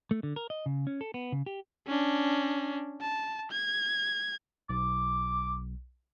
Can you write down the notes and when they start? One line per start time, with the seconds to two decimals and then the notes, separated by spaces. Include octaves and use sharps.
0.11 A3
0.23 D3
0.36 A#4
0.50 D#5
0.66 C#3
0.87 C#4
1.01 A4
1.14 B3
1.32 C#3
1.46 G4
1.87 C#4 D4
3.02 A5
3.52 G#6
4.70 B1 D6